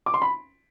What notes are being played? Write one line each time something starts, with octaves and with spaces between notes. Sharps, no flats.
D6
C6
B5